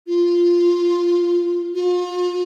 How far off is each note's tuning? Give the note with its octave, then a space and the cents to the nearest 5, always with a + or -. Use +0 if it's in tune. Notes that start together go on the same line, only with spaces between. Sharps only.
F4 -5
F4 +40